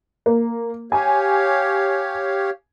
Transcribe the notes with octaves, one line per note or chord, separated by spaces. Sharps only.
A#3
G4 C#5 F5 G#5